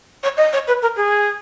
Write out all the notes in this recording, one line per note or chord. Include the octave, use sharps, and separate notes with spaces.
C#5
D#5
C#5
B4
A#4
G#4